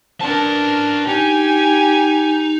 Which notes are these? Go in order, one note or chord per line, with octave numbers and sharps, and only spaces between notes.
D4 A#4 B4 A5
D#4 G4 G#5